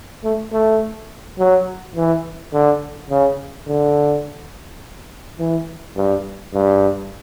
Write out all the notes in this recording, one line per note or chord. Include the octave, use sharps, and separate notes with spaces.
A3
A3
F#3
E3
D3
C#3
D3
E3
G2
G2